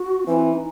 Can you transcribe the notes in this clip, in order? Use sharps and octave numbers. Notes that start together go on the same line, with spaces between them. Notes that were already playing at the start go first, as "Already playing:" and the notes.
Already playing: F#4
E3 C4
D#4